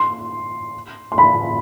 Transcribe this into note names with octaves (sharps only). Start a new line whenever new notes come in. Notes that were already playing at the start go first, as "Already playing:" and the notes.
Already playing: C6
C6
B5